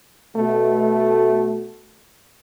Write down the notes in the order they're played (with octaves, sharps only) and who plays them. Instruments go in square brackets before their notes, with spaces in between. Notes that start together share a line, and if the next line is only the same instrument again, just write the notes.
[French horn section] B2 A3 F#4